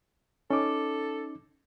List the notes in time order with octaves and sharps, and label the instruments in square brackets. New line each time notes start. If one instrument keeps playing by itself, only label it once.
[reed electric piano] C#4 D#4 D6 [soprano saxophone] A4